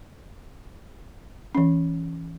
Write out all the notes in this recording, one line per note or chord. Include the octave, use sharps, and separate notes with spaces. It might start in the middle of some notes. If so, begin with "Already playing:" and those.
E3 C#4